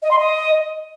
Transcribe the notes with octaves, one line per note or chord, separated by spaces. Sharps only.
D#5
C6
D#5